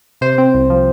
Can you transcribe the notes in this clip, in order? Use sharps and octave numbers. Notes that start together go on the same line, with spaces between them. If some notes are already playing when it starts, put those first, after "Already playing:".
C3 C5
C4
C2
F3